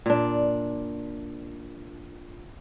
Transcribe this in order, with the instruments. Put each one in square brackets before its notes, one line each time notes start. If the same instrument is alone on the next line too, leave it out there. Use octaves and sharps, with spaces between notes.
[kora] A#2 D4